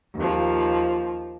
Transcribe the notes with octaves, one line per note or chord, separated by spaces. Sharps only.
D#2 F3